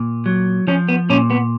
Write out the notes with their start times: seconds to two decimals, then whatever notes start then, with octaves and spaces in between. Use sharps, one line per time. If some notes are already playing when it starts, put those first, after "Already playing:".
Already playing: A#2
0.26 F#3
0.67 F3 C#4
0.88 B3
1.10 A#2 C#4
1.30 B3